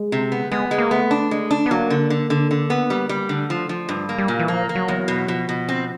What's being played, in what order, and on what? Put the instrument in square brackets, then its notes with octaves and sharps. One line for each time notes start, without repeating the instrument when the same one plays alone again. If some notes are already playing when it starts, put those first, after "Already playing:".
Already playing: [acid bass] G#3
[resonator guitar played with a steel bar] C3
B3
[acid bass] G#3 [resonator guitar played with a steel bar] B3
[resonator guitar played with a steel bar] G#3
[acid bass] A#3
[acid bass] A3 [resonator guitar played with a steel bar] B3
[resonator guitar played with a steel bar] D4
G#3
D4
[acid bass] B3
[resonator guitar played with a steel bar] F#3 [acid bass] A#3
[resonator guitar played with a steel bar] D3
D3
D3
D3
B3
G3
G3
[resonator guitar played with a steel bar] D3 [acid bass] A3
[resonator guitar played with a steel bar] F3
F3
G2
[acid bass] G#3 [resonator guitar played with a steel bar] A#3
[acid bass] G3
[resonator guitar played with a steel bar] A#2
[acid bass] E3
[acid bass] F3 [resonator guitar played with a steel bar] A#3
[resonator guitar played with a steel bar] A#3
[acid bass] F#3
[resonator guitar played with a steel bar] E2
B2
[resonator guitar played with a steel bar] B2 [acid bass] F3
[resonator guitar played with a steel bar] B2
C4